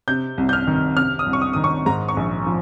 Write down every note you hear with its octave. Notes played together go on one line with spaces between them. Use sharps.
C3 G6
C2
G6
F6
D#3
C3 F6
D#6
C2
C#6
D#6
D#3 D#6
C#6
G#2 A#5
C#6
A#1
F3